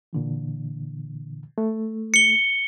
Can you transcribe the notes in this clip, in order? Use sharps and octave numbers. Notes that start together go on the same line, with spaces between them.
A#2 D3 E3
A3
C#7 G7